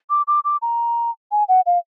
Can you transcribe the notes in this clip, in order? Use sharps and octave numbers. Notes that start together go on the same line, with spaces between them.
D6
D6
D6
A#5
G#5
F#5
F5